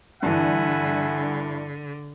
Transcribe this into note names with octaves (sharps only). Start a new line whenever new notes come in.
G2 D3 E3 E5 F#5 G#5